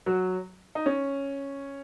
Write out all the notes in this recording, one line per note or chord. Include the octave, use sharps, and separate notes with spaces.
F#3 F#4
D#4
C#4